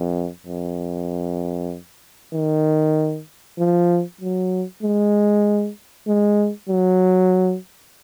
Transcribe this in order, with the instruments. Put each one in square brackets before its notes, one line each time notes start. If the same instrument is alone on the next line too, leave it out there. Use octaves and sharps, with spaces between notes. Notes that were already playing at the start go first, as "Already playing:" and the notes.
Already playing: [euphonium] F2
F2
D#3
F3
F#3
G#3
G#3
F#3